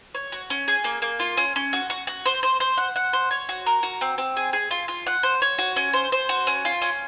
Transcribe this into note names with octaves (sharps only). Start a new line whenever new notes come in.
C#5
F#4
C#4
G#4
A#3
A#3
F4
C#4
C#4
F#4
F#4
F#4
C5
C5
C5
F#5
F#5
C5
C#5
F#4
A#4
F#4
C4
C4
G#4
G#4
F4
F4
F#5
C5
C#5
F#4
C#4
C5
C5
F#4
C#4
F4
C#4